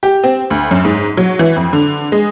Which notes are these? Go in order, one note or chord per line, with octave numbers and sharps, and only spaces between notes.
G4
C4
D2
F#2
G#2
F#3
E3
F2
D3
G#3